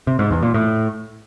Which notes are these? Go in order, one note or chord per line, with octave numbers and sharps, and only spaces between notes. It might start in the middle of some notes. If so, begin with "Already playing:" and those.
C3
G#2
E2
A#2
A2